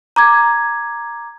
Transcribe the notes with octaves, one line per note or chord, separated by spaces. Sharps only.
A#5 D6 G#6